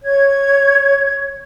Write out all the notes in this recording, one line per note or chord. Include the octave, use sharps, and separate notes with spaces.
C#5 G#6